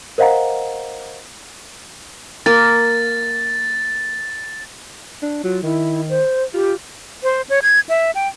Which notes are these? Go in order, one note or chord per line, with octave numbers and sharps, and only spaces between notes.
A#4 C5 D#5 F5 F#5 A#5
A#3 A#4 A6
D4
F#3 F4
D#3 E4
C5
F4 G4
C5
C#5
G#6
E5
G5